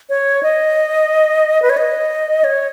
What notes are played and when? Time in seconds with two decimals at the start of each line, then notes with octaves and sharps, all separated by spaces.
0.09 C#5
0.43 D#5
1.62 B4
1.70 C#5
1.77 D#5
2.44 C#5